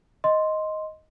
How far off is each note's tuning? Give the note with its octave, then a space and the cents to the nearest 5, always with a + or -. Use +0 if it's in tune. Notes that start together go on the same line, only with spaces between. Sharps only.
D#5 +5 C6 +0